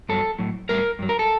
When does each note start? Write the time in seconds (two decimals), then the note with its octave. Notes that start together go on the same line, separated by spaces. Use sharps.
0.09 G2 F#3 A4
0.39 A2 F#3
0.69 A2 G3 A#4
0.99 G2 F#3
1.09 A#4
1.19 A4